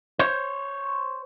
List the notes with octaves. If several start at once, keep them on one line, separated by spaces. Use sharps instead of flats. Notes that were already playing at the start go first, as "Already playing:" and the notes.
C5 C#5